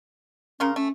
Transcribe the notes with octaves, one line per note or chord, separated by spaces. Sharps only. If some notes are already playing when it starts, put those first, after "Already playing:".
C#3 C#4 A#4 C6
A3 C#4